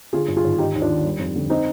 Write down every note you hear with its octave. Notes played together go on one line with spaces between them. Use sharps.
D3 F4 G#4
G2
F4 G#4
G#1
D#3 D#4 G4
D#2
D4 F4
D#3
G3
F2
D3
C4 D#4